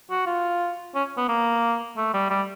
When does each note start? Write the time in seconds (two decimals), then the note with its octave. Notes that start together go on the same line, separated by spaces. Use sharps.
0.10 F#4
0.26 F4
0.95 C#4
1.17 B3
1.29 A#3
1.97 A3
2.14 G3
2.30 G3